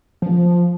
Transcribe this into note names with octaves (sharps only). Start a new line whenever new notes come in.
F3